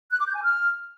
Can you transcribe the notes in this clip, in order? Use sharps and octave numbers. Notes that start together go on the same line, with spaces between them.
F#6
D6
G6
G#5
F6